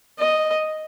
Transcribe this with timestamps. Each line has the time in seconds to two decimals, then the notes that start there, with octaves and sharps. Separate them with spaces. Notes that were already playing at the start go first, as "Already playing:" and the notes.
0.19 D#5